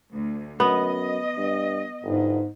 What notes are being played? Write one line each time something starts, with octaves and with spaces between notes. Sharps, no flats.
D2
F#2 B3 D#5
G2
G1 G#2